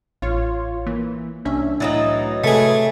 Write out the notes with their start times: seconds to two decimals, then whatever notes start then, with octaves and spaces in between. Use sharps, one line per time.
0.22 A1 F4 C#5
0.87 E3 A#3
1.45 C2 C#4 D4 E5
1.80 A2 E3 F#3 D#4 A6
2.44 C3 A3 G#4 B4